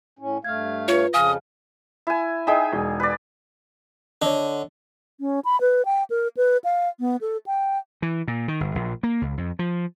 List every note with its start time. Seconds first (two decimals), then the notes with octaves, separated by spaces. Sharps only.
0.19 A2 C#4
0.44 G2 A3 F5 F6 G#6
0.88 F4 B4 C#5
1.14 F2 C#3 F3 F5 G#5 D#6 F6
2.07 E4 G#5
2.47 D#4 G#4 D#5 E5 G5
2.72 E1
3.00 B4 D5
4.22 D3 C#5 D#5
5.20 C#4
5.45 B5
5.61 B4
5.85 G5
6.10 A#4
6.37 B4
6.64 F5
7.00 B3
7.21 A4
7.46 G5
8.02 E3
8.28 A#2
8.48 D#3
8.60 G1
8.75 A#1
9.03 A#3
9.21 C#2
9.37 F2
9.59 F3